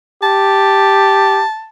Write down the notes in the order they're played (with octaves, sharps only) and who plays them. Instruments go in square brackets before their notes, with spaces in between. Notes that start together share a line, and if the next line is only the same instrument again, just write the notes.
[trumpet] G4 [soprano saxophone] A5